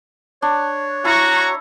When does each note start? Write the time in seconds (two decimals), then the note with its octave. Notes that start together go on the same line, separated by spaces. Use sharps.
0.42 D4 C#5
1.05 E4 F#4 A#5 C#6